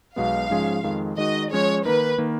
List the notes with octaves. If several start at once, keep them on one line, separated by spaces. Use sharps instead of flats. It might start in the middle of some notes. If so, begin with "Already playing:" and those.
B1 B2 G#3 B3 F5
G#2 F3 G#3 C#4 G#4
F2 D#3 G#3
D#3 G#3 D#4 F#4 D#5
F3 G#3 C#4 G#4 C#5
D#3 A#3 D#4 A#4 B4
D#3 A#3